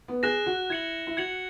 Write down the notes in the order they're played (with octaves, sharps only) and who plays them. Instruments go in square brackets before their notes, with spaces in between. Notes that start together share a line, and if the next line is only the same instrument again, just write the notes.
[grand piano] B3
[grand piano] G#4 [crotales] F#6 A#6 E7
[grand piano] F#4
[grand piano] E4 [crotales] G#6 C#7 F#7
[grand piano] E4
[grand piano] F#4 [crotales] G#6 C#7 F#7